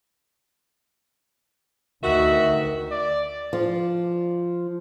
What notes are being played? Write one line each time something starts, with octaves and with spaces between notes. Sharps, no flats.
D2 D#3 F#4 E5
D5
F3